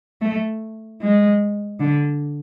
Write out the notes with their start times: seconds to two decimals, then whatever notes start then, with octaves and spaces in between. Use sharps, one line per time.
0.21 A3
1.01 G#3
1.79 D3